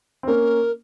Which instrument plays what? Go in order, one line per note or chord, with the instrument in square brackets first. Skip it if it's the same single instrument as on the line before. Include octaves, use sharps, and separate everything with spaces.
[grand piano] C4
[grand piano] A#3 C#4 [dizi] A#4